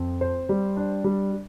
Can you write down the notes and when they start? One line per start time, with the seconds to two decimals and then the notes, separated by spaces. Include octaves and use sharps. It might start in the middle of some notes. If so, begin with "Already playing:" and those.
Already playing: F2 C4
0.21 C5
0.49 G3
0.76 D4
1.04 G3